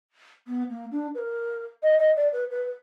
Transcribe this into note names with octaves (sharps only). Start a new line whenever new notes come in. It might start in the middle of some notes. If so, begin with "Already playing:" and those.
B3
A#3
D4
B4
A#4
D#5
D#5
D5
B4
B4